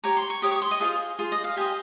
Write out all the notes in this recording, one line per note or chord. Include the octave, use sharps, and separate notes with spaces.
G4 C#5 A#5
C6
C#6
G4 C#5 D#6
C#6
C6
D#5
F4 G#4 C5 F5
F4 G#4 C5
D#5
F5
G4 C5 D#5 G#5